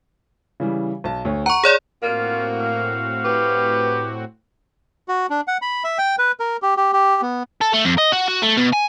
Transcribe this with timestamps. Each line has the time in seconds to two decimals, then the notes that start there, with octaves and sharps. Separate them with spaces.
0.60 C#3 E3 G3
1.04 B1 A5
1.25 D2 C#5
1.46 F#5 A#5 C#6
1.64 G#4 C#5 D5
2.03 A2 A#3 C4 F4 F#4
2.61 F5
3.25 G4 B4
5.08 F#4
5.30 D4
5.48 F#5
5.62 B5
5.84 E5
5.98 G5
6.19 B4
6.40 A#4
6.62 G4
6.77 G4
6.93 G4
7.22 B3
7.61 A4
7.73 A3
7.85 F2
7.98 D#5
8.12 F#4
8.28 F#4
8.42 A3
8.57 B2
8.73 G#5